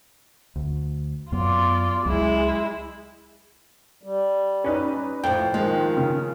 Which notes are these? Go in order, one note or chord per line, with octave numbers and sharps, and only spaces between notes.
D2
F#2 F#3 B3 F4 D5
C#2 F#3 G#3 E4
G3
C#4 D#4 B4 D5
F2 A2 G5
D#3 F3 G#3
C#3